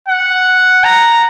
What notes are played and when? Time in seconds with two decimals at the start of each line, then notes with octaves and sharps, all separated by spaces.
0.08 F#5
0.84 A#5